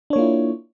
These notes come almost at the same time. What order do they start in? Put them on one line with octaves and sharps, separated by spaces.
D4 C#5 A#3 F4 E4